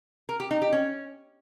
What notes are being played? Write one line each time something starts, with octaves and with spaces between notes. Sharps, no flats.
A#4
G4
D#4
G4
C#4